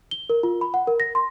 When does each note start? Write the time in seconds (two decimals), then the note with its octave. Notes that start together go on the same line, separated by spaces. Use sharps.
0.11 G7
0.30 A#4
0.43 F4
0.61 B5
0.74 F#5
0.87 A#4
1.00 A#6
1.15 C6